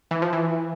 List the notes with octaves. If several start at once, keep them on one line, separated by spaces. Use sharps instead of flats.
E3
F3
E3